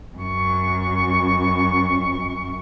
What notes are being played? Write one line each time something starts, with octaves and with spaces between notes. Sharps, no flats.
F#2 C#6